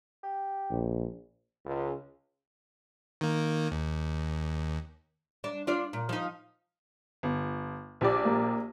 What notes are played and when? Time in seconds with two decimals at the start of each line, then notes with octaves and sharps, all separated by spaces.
0.23 G4
0.71 A#1
1.66 C#2
3.21 D#3 A#3
3.72 D#2
5.44 D4
5.67 D4 F4 D5
5.93 A#2
6.09 F3 D#4
7.23 G1
8.01 A#1 G4 D5
8.25 A#3